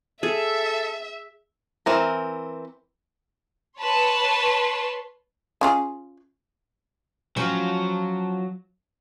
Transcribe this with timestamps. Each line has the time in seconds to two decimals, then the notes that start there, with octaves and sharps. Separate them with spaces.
0.23 G#4 A4 E5
1.86 E3 C4 A#4
3.81 B4 C#5 A5 C6
5.61 C#4 F4 G#4
7.37 F3 F#3 C#4